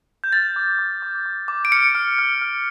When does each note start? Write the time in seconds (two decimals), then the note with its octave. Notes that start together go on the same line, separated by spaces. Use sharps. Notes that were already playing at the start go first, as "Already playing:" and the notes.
0.24 G6
0.33 F6 A6
0.56 D6
0.79 D6
1.02 D6
1.26 D6
1.48 D6
1.65 D7
1.71 F6 C#7
1.95 F6
2.18 F6
2.41 F6